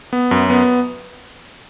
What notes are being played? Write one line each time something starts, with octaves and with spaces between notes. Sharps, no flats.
B3
F#2
B3